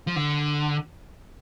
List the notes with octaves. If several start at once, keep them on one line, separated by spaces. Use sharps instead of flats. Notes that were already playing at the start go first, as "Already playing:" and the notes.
F3
D3